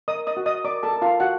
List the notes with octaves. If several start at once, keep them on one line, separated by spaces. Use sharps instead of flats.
A#4 D#5 D#6
D#5 D#6
F#4
D#5 D#6
A#4 D5 D6
A4 A5
A#4
F4 F5
F#4 F#5